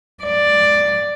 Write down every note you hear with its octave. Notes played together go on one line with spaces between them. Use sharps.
D5